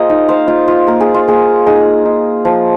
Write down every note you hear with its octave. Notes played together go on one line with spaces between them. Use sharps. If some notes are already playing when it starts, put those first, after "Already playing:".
Already playing: A#3 F4 G#4 A#4 C5 D#5
D#4
C5 F5
D#4 F4
F4
A#3 A#4
G#4
F4
A#3 G#4
D#4 G#4
D#4
F3